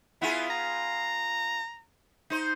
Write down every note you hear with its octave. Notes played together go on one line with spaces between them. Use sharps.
B3 E4 F4 G#4
A#5
D#4 C5